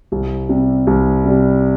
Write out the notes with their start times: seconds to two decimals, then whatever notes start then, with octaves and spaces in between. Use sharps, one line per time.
0.12 C2
0.49 C3 G3
0.87 C2
1.25 C3 G3